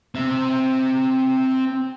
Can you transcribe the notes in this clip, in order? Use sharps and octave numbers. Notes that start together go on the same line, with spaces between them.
C4 E5